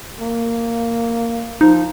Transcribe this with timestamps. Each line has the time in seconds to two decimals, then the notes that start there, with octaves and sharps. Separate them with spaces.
0.21 A#3
1.61 F3 D#4